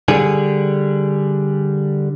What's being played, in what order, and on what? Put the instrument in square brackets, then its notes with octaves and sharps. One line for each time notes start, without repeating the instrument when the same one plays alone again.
[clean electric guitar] D3 G3 G#4